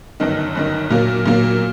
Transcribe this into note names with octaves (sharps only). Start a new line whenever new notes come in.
G1 F#2 D#3
G1 F#2 D#3
A#2 F#3 A#3
A#2 F#3 A#3